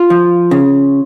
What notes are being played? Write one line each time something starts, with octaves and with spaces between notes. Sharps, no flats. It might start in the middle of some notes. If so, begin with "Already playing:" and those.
Already playing: F4
F3
C#3